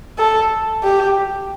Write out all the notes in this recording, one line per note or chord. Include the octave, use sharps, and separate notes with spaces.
A4
G4